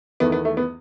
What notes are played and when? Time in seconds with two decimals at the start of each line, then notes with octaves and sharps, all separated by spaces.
0.20 E2 D#3 A3 B3
0.32 B3
0.45 A3
0.57 B3